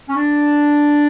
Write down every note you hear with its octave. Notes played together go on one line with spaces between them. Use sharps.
C#4
D4